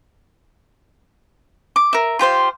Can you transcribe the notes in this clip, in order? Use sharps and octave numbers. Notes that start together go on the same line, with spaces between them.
D6
A#4 E5
F4 G4 C5 F5